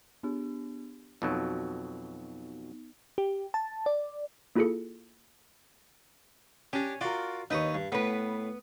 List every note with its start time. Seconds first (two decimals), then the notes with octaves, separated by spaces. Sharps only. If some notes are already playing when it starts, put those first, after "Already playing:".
0.23 B3 D4 G4
1.22 F2 B2 F#3 B3 D#4
3.18 G4
3.54 A5
3.86 D5
4.55 A#3 E4 F4 G#4 A4 C#7
6.73 C#4 D4 G4
7.01 F4 F#4 A#4 D5
7.50 D#2 D#4 B4 C#5 D#6
7.74 G2
7.92 A2 B3 B4